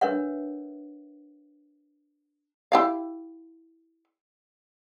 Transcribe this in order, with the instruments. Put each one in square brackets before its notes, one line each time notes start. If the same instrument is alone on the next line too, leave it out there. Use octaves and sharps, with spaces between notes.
[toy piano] D4 A#4 B4 C#5 E5 F#5
[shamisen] E4 G4 F5